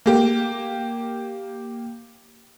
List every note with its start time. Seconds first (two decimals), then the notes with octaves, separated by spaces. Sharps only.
0.06 A#3 G4